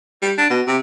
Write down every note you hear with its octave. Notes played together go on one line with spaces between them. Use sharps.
G3
D4
B2
C3